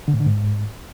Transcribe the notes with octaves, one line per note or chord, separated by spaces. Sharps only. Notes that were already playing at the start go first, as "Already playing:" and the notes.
D3
A2
D3
G#2